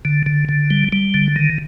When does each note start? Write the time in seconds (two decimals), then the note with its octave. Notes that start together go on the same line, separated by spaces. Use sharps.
0.05 D3
0.26 D3
0.49 D3
0.70 G3
0.93 G3
1.14 D3
1.36 D#3